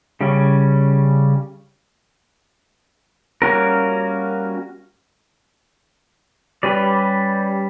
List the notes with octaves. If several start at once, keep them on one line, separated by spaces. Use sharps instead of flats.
C#3 G3 C#4
G3 A#3 C#4 F#4 A#4
G3 C#4 G4 B4 D5